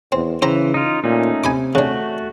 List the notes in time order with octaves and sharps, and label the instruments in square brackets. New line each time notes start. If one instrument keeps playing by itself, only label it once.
[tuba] E2 [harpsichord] C4
[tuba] C#3 [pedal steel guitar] E3 [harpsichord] C5 G5 A#5
[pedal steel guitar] D#4 F4
[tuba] A#2 [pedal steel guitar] A3 C#4 D#4
[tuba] C3 [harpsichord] G#5 B5 D6
[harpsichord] C#3 D4 [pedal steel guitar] A3 F#4